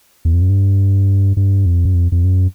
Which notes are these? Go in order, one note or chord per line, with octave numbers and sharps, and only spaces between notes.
E2
F2
F#2
G2
G2
F2
F#2
F2
F2
F#2